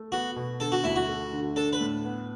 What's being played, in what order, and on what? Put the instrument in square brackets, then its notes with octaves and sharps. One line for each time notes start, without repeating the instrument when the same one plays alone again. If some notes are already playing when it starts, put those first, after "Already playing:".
Already playing: [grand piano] A3
[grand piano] B3 [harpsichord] F#4
[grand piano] B2
[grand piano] D3 [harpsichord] A4
[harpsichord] F#4
[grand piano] D2 [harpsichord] E4
[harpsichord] F#4
[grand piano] A3
D3
[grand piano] D4 [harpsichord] A4
[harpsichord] B4
[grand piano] A2
B3